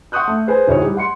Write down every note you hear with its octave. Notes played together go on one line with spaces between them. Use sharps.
F#5 C6 C#6 D#6 F#6 G6
A3
G#4 B4 C5 G#5
D1 D2 F#3 D#4 G#4 C#5
G3
F#5 C6 C#7